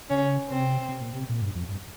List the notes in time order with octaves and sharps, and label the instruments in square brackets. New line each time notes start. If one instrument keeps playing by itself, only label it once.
[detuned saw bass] C#3 [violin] C#4
[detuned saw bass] C3 [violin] C4
[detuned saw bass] C3
A#2
C3
A#2
G2
F2
G2